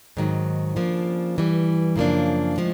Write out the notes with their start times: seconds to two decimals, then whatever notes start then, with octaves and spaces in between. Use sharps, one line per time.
0.17 G#2 D#3 F#3
0.76 C#3 F3 A#3 D4
1.36 G2 E3 G3
1.96 F#2 C#3 F3 A#3 D4
2.56 A2 F3 G#3